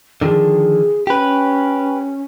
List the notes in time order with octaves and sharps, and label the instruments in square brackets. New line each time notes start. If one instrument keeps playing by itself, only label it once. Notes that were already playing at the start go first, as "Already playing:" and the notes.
[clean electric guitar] D3 D#3 F3 [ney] G#4
[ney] C#4 [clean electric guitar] G4 B4